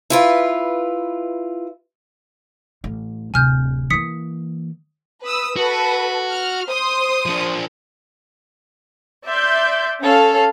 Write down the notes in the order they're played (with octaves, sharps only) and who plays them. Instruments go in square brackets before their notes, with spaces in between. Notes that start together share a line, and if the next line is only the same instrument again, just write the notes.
[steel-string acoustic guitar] E4 F4 B4
[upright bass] A1
[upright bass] D1 C3 [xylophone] G#5 F6 G6
[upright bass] E3 A#3 [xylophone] D#6 B6 C#7
[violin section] B4 D#6 E6
[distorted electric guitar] F#4 [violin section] A4 B4
[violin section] F6
C5 C6 D#6
[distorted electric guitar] F3 D4
[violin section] D5 E5 C6 G6
C#4 A4 F5